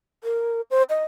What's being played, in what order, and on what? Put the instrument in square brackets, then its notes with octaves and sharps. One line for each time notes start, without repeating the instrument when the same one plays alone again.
[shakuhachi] A#4
C5
D#5